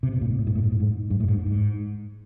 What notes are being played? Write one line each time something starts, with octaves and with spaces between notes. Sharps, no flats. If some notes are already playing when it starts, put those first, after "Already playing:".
C3
B2
A#2
G#2
A2
G#2
A2
G#2
A2
G#2
G2
A2
G#2
G#2